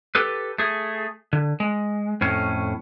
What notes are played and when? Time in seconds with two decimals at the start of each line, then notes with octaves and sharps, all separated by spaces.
0.15 G4 A4 B4
0.58 A3 G#4
1.33 D3
1.60 G#3
2.21 F2 A2 C#4